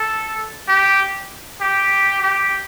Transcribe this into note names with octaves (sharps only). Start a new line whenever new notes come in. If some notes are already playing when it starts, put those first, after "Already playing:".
Already playing: A4
G4
G4
G4